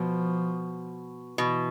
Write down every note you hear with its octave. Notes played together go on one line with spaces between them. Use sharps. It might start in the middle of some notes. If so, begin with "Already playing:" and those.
Already playing: B2 F3
B2 E3